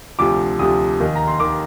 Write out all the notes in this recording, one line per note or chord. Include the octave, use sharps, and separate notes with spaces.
D2 C3 F3 D6
D2 C3 F3 D#6
D#2 D#3
A#5
C6
D#3 D6